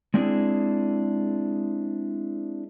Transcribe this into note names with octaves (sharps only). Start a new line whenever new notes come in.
G#3 C4 D4 E4 G4 G#4